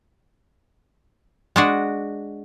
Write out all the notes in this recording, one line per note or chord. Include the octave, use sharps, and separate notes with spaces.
G#3 D4 F#4